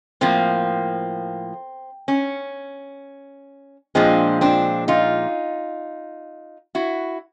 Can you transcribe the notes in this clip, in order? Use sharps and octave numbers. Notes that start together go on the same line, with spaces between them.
A2 F3 A#3 C4
C#4
A#2 F3 G#3 C4 D4
C4 D4
D#4 F4
E4 F#4